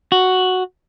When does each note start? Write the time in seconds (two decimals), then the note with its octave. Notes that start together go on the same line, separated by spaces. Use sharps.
0.12 F#4